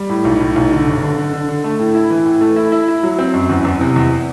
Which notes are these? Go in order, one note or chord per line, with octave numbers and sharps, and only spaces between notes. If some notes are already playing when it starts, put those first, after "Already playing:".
Already playing: G3
A2
B1
A2
B1
D3
G1
D3
D3
D3
D3
A3
A2
E4
E3
A2
A3
E4
E4
E4
F#3
C4
F#2
E2
E2
C3
E2